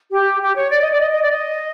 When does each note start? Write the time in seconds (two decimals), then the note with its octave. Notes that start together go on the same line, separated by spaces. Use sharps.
0.11 G4
0.41 G4
0.55 C#5
0.70 D5
0.80 D#5
0.90 D5
1.00 D#5
1.11 D#5
1.21 D5
1.30 D#5